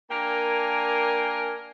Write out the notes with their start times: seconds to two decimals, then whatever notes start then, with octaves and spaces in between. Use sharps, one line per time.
0.10 A#3 D4 A#4 G5 G#5